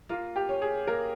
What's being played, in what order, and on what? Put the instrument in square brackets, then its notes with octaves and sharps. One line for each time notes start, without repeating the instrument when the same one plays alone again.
[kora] A#3 [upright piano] F4
[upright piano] G4
[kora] C#4
[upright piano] G#4
[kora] A#3 [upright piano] A#4